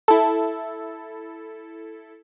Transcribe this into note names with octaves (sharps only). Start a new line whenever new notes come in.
E4 A4